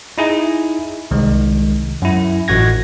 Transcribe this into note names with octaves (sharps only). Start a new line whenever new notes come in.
D#4 E4 G#4
C2 D#3 G#3
F#2 E4
A1 F#4 F#5 G#6 A#6